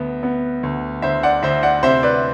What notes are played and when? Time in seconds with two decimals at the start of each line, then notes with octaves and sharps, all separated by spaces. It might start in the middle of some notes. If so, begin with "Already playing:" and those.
Already playing: D2 B3
0.23 B3
0.63 D2
1.02 D2 C5 E5
1.23 D5 F#5
1.43 D2 C5 E5
1.63 D5 F#5
1.83 C3 C5 E5
2.03 B4 D5